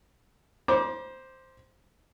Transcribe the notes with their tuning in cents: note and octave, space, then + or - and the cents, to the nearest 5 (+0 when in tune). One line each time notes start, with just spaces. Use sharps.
C5 +0 A#5 +45 D6 +0